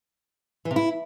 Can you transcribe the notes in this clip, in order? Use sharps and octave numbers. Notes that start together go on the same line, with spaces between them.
E3
C3
E4